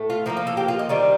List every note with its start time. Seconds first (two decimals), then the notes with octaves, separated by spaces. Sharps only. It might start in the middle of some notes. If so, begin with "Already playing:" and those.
Already playing: A2 A3
0.10 F4
0.26 F3 A#3 D#4 F4
0.37 F4
0.47 A4
0.57 G4
0.68 F4
0.79 D#5
0.89 D#3 G3 D4 D#5